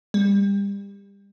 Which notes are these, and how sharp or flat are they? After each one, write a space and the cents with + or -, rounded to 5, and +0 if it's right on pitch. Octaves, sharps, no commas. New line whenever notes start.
G3 +30